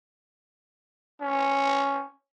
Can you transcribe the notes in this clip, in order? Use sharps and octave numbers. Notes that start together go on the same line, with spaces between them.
C#4